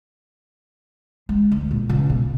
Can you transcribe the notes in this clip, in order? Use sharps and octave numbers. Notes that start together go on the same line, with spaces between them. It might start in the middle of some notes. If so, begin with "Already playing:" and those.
G#3
D2
A#2
C#2
B2